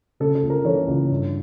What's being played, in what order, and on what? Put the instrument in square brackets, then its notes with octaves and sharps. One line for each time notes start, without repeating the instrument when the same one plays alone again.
[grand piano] C#3 A4
A4
C#2
A#4
E3 A4 C#5
C#2
G2